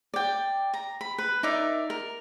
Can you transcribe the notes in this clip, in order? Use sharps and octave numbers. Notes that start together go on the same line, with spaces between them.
D5 G5
A#5
B5
B4
D#4 A#4 D5 E5
A#4